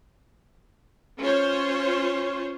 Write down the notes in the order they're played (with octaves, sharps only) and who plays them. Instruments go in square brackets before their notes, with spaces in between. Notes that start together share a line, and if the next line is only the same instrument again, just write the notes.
[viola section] C#4 F4 C5 C#5